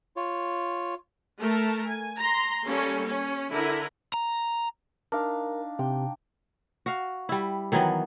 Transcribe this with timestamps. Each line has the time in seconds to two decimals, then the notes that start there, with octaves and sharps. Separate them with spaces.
0.16 F4 C#5
1.41 A3 A#4 A5
1.87 G#5
2.19 A#5 C6
2.66 G3 A#3 C#4 A4
3.06 C#4
3.50 D3 E4 A#4
4.14 A#5
5.12 D4 D#4 A#4 F5
5.79 C3 G5
6.86 F#4 F5
7.29 G3 E4
7.72 D#3 E3 F#3 B3